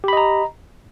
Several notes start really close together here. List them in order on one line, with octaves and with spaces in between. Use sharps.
G4 B5 D#5 A#5